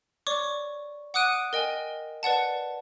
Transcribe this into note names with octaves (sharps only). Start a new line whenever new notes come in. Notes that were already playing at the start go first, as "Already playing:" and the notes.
C#5 D5 C#6 D6
F#5 D6 D#6 F#6 D7 D#7
A#4 D#5 G5 G#5
B4 D5 F#5 A5